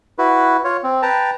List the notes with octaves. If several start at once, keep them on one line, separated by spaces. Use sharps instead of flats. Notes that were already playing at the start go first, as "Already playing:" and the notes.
E4 F#4 B4
F4 C#5
C4
B4 G5 A5 A#5